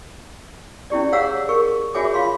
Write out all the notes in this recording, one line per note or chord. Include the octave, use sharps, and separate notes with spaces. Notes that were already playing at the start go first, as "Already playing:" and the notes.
C#4 E4 G4 D5
G#4 C#5 F5 F#5 A#5 E6
G#4 A#4 C#6
F#4 G#4 C#5 E5 G#5 D6
F4 F5 C6